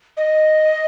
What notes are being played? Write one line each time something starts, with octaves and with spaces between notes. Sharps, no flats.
D#5